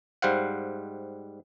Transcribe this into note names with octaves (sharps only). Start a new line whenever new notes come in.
G#2 G3 C5 F5 F#5